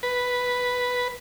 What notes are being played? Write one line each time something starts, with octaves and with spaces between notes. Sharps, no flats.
B4